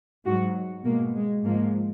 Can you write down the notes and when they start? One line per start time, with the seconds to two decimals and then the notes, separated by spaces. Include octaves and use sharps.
0.25 G#2 F#3 F#4
0.84 B2 G#3 A#3
1.14 G#3
1.43 G#2 F3 G#3 A#3